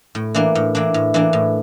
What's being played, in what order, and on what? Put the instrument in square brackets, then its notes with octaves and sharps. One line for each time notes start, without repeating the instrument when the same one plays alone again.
[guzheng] A2
E3 A#3 D4
A2
E3 A#3 D4
A2
E3 A#3 D4
A2